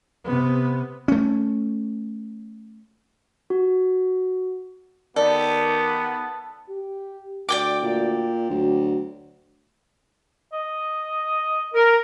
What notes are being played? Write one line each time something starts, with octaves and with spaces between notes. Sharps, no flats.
C3 B3
A3 C#4
F#4
D#3 B3 G4 A4 D5
G4
D2 D5 G5 D6
A#2
D2 F#3
D#5
A#4